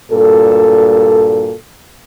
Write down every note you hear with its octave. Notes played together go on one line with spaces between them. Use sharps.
G2 A#2 F#4 A4